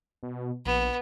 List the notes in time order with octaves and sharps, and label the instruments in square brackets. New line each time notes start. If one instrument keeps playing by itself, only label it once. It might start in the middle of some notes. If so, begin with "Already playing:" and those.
[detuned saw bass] B2
[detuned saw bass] A#1 [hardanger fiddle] B3